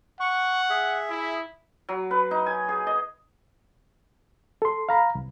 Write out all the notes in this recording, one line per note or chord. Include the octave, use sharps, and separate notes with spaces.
F#5 C#6
G#4 E5
E4
F#3
B4
D#4
G#5
G#4
D#5
A4 C6
F5 A#5 B5
C2